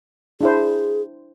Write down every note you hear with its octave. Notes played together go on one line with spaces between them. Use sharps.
D4 E4 G#4 C5